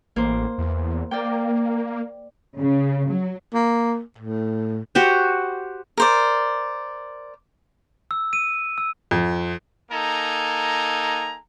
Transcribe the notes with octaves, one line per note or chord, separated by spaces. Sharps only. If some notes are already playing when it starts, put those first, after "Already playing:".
A1 A#3 C5
E2
A#3 D5 G5
C#3
F#3
A#3
A2
F#4 G4 C5
A#4 C5 D5
E6
D#7
E6
F2
A#3 D#4 A4 G#5 A#5